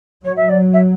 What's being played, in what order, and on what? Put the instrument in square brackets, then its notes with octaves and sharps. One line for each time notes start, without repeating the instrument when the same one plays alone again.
[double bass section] F#3 [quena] C#5
[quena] E5
D5
E5